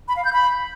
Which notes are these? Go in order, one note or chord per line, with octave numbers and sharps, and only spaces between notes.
B5
F5
G6
B5